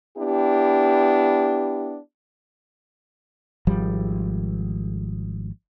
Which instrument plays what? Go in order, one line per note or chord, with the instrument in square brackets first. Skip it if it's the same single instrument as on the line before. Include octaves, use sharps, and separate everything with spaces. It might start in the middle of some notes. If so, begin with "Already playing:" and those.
[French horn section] B3 D4 E4 G4
[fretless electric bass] G#1 F3 G3